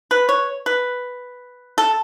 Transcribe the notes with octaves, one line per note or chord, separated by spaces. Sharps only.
B4
C#5
B4
A4